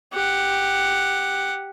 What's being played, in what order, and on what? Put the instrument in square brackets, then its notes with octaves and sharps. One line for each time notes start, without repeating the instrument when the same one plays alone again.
[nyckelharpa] G4 F#5